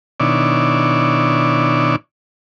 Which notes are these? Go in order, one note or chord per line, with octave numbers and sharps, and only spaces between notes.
B2 D#3 D4 E4 C#5 D5